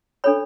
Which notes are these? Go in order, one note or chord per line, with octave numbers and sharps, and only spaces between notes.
D4 A4 C#5 B5